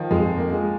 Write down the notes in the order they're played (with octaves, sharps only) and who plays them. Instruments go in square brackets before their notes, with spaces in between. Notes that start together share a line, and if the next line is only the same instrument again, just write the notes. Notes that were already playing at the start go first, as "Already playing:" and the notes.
Already playing: [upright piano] D#3 F3
[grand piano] F2 [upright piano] G#3
[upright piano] A#3
[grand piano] G#3